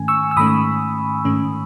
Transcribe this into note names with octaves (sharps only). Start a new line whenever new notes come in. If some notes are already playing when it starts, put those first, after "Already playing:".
Already playing: G#2 D#3 A3 C#4 G#5
C#6 E6
E6
G#2 D#3 A3 C#4 B5 D#6
G#2 D#3 A3 C#4